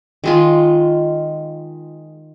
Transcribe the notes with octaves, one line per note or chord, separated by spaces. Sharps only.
D#3 G#3 F4